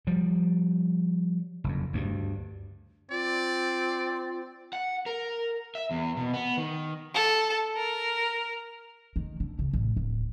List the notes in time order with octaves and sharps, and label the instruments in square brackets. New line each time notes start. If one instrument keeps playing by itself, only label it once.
[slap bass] F3 G3
F#1 F2
D2 G2
[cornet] C4 [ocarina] F4 [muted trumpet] D5
[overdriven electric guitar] F#5
A#4
E5
E2
B2
B3
D#3
[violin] A4
A#4
[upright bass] D#3
D3
C#2
A1
D1